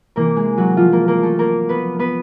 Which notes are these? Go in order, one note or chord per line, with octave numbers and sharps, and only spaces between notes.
C3 E3 A#3 A#4
G#3 G#4
F#3 F#4
F3 F4
A#3 A#4
A#3 A#4
A3 A4
A#3 A#4
B3 B4
B3 B4